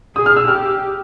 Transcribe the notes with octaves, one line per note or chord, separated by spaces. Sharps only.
G#4 D#6
F6
E6
G4 F6